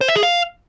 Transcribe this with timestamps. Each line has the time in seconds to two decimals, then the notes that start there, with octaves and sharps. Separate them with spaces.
0.01 C5
0.08 E5
0.16 G#4
0.23 F5